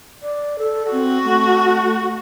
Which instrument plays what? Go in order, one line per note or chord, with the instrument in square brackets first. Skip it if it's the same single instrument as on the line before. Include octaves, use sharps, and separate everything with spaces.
[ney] D5
A4
[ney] C4 [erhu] F#4
[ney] A3